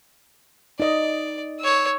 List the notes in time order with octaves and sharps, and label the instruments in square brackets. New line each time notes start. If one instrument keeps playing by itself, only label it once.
[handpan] D#4 D#5 [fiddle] D5
[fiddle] C#5 E6